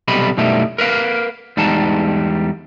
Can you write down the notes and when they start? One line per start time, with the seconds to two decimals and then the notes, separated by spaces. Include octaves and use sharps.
0.08 B1 C3 G3 D#5 B5
0.37 F#2 B2 G3 A3 D#4 E4
0.78 A#4 B4 D#5 F5
1.57 E2 G3 G#3 D#4 A5